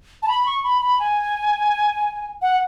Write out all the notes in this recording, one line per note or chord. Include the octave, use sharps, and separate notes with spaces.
A5
B5
C#6
B5
B5
G#5
F#5